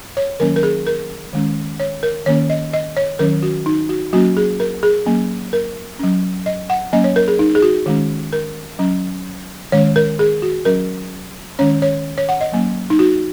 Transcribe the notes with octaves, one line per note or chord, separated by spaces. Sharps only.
C#5
D#3 F#3 A#3 C#4 A#4
A#4
G#4
A#4
D#3 G#3 C#4
C#5
A#4
D#3 A#3 C#4 C#5
D#5
D#5
C#5
D#3 F#3 C#4 A#4
F#4
D#4
F#4
F#3 A#3 C#4 F#4
G#4
A#4
G#4
F#3 A#3 C#4
A#4
F#3 C#4
D#5
F#5
F#3 A#3 C#4 D#5
C#5
A#4
G#4
D#4
G#4
F#4
D#3 G#3 C#4
A#4
F#3 C#4
D#3 G#3 C#4 C#5
A#4
G#4
F#4
F#3 C#4 A#4
D#3 G#3 C#4 C#5
C#5
C#5
F#5
D#5
F#3 A#3 C#4
D#4
F#4